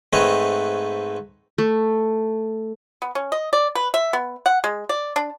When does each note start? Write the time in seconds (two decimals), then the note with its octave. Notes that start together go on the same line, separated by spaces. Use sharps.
0.13 G#2 A3 C4 B4 C#5 D#5
1.58 A3
3.02 B3
3.15 C#4
3.32 D#5
3.53 D5
3.75 B4
3.94 E5
4.13 B3
4.46 F#5
4.64 G#3
4.89 D5
5.16 D4